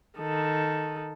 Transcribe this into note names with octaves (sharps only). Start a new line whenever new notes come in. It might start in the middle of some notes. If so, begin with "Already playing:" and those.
D#3 A4